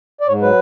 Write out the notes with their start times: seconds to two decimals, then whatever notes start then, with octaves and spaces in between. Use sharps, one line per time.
0.21 D5
0.27 G#2 C#5
0.42 F#3 B4